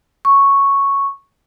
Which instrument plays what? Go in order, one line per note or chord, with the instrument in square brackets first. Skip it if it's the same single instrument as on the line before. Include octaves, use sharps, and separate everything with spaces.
[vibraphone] C#6